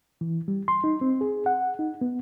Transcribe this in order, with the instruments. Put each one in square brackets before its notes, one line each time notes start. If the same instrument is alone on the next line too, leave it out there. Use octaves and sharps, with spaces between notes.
[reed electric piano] E3
G3
C6
D#4
C4
G#4
F#5
D#4
B3